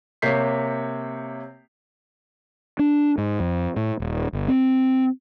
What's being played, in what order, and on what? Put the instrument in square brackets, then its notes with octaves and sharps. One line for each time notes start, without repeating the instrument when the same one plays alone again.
[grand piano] C3 A#3 C#5 G6 B6 C7
[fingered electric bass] D4
G#2
F2
A2
D#1
G1
C4